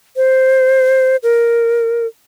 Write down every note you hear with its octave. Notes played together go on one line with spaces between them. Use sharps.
C5
A#4